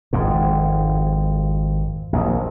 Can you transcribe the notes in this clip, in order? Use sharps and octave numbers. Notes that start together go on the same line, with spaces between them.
G#1 F2 G#2
A#1 D#2